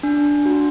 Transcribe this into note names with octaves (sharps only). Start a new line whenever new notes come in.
D4
F#4